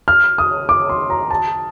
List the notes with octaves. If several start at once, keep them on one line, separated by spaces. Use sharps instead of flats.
F6
D#6
D6
C6
A#5
A5